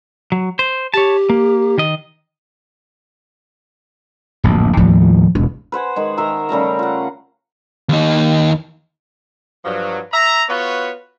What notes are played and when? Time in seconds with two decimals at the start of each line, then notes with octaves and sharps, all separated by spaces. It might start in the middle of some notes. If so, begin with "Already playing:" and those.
0.32 F#3
0.59 C5
0.94 G4 C#5 A5
1.30 A#3
1.78 D#3 D#5
4.44 D1 A#1 F#2
4.77 D#2 A2 F3 G3
5.35 E1
5.72 B4 C5 F#5 G#5
5.96 D#3 G#3 F#5
6.17 D#3 A#4 E5 A#5
6.49 C#3 G3 A3 A#5
6.79 F4 F#5
7.89 D#2 D#4
9.65 G2 F3 F#3
10.13 E5 A#5
10.49 B3 F4 F#4 B4 C#5